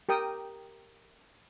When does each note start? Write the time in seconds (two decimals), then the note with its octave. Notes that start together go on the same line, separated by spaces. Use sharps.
0.09 G4 A#4 G5 D#6